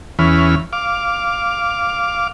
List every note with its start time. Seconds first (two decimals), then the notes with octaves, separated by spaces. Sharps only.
0.19 E2 E3 C#4 B5 F6
0.73 F5 D6